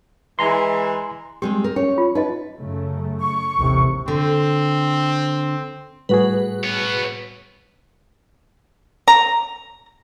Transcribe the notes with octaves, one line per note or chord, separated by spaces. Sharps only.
E3 G#3 G#5 A#5 C6
G3 G#3 C4 G4
A#4
C#4 C#5
F4
D#4 B4 D#5
F#2 C#3 A3
C#6
A1 D#2 C3
D3 C4
A2 G3 F#4 G#4 B4
B3 C#5
A#5